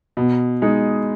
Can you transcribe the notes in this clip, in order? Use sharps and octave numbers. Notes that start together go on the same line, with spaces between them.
B2
G#3 D#4